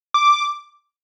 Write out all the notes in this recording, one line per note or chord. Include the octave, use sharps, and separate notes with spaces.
D6